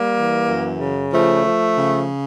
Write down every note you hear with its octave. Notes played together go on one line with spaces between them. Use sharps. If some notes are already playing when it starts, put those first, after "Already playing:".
Already playing: G3 A#3
E3
F#2
C#3
F3 A3
F3
C#3